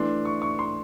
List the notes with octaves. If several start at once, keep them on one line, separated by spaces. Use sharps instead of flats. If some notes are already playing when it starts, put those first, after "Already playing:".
Already playing: E3 A3 D4 C6
C#6
C#6
C6